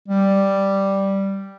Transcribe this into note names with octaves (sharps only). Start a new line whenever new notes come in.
G3